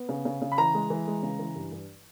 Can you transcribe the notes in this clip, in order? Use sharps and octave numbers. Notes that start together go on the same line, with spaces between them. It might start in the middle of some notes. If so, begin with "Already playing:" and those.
Already playing: B3
C#3
C#3
C#3
B5
E3 A#5
G#3
E3
G#3
C#3
E3
G2
G2